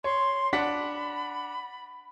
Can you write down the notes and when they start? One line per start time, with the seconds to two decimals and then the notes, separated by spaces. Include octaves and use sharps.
0.04 C#5 C6
0.53 D4 F#5 B5 B6